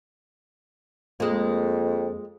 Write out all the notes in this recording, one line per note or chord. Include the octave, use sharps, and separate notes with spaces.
F2 G#3 A#3